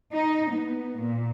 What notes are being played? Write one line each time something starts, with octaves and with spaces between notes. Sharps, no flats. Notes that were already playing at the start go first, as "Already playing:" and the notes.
D#4
B3
A#2